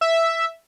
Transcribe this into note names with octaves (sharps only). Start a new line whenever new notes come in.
E5